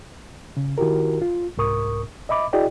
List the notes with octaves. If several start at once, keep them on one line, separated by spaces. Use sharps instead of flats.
C#3
D#3 E4 F#4 G4 A#4
F4
C2 G#2 A#4 C#6 D#6
D#5 E5 B5 D6
E4 F#4 G#4 D5 D#5 G5